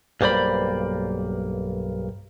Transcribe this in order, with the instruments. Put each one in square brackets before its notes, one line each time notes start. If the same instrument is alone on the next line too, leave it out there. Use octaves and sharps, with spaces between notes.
[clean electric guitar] B1 G2 A#3 C5 D5 B5